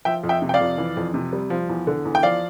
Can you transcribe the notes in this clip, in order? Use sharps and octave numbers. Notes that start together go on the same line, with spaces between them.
F3 E5 G5
F2
E5 G5
C3
G5
D5 F5
F2
E3
F2
C3
G3
F3
E2
D3
E2
G5
F3 D5 F5